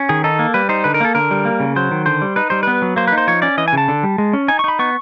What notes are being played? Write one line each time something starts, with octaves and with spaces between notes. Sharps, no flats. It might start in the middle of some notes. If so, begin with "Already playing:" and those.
Already playing: C#4
D#3 G#4
D#4 A4
A#3
G3 B4
D#4 C5
D3 B4
A#4
A#3 A4
D3 A#4
G3
A#3
C#3
F#3 C5
D#3
D3 C5
G3
D#4 B4
G3 C5
B3 B4
F#3
A#3 C5
B4
D#4
C5
F3 C#5
C#4 D5
E3 D#5
G#5
C#3 A5
D3
G3
G#3
C#4
D#4 G#5
C#6
D#4 B5
B3 C#6